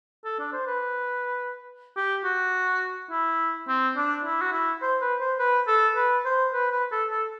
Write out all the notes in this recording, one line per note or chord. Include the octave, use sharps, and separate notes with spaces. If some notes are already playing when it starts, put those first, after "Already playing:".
A4
D4
C5
B4
G4
F#4
E4
C4
D4
E4
F#4
E4
C5
B4
C5
B4
A4
B4
C5
B4
B4
A4
A4